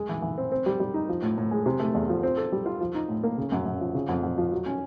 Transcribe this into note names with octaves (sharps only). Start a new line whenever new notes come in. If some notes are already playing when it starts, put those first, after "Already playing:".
Already playing: G#3
E3
E3
C4
C4
G3
G3
D#4
F3
A2
A2
G#3
C3
A3
E2
F3
C4
A4
G3
F4
F3
D#4
A2
A#3
C#3
F#2
F#2
F3
C#3
F2
F2
F3
F#3
C#4